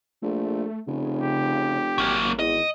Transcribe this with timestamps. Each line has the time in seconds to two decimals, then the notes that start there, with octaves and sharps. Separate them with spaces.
0.22 A#1 A3
0.87 F1 C#3
1.23 G4
1.98 G#1 F#3 A#3
2.39 E2 D#5